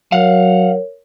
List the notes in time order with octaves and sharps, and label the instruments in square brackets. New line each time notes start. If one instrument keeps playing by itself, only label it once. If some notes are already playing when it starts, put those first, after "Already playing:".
[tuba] F#3 [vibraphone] A#4 C#5 [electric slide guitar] F5 F#5